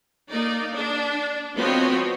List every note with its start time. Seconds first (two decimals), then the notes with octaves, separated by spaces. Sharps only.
0.29 A#3 D#4 D5
0.75 D4
1.57 F3 B3 C4 F#4 C#5 D#5